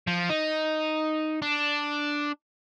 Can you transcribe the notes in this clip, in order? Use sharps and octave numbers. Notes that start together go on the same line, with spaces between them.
F3
D#4
D4